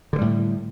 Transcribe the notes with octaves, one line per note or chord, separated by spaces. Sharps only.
A2 D3 E3 G3